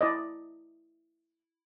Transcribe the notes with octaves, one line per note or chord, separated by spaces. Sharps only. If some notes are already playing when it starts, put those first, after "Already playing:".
E4 D5 D#5